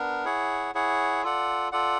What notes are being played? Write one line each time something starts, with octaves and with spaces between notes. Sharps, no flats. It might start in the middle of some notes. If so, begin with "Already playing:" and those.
Already playing: B3 D4 A#4
E4 G#4 C#5 F#5
E4 G#4 C#5 F#5
F4 A4 D5 F#5
F4 A4 D5 F#5